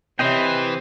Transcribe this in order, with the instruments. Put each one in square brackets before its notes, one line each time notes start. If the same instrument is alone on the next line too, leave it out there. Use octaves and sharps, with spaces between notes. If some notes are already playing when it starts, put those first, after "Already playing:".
[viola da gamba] C3 [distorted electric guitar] E3 [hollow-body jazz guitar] C4 C#5 E5 [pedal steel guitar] C5 D#5 G5